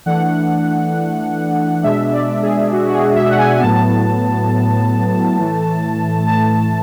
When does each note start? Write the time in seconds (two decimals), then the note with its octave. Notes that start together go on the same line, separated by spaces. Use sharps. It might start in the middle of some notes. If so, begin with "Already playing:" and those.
0.06 E3 A3 D4 F#5
1.83 B2 G#3 D4 E5
2.13 D5
2.42 G#4
2.72 F#4
2.89 F#4
2.94 G#4
3.16 E5
3.29 F#5
3.38 G#5
3.56 G#5
3.60 A2 F#3 B3 A5
5.38 A2 E3 A3
6.26 A5